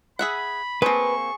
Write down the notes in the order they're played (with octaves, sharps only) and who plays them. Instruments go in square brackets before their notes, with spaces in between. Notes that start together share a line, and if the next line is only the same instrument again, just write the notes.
[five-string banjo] G#4 E5 F#5 [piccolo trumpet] B5
[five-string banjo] A#3 C4 [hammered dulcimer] G#4 A5 [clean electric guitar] B4 [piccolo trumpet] C#6